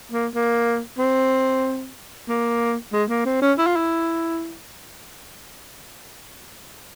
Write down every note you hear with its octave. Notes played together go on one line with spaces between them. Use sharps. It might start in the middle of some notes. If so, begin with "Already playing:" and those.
A#3
A#3
C4
A#3
G#3
A#3
C4
C#4
E4
F4
E4